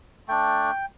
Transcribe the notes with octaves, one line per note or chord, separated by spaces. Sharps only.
A3 D4 G5